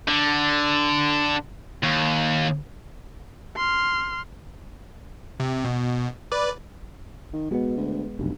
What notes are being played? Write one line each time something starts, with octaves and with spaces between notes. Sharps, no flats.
D3
D#2
C6 F6
C3
B2
B4 D5
D#3
B2 G#3 B3
D2
F1 B1 G2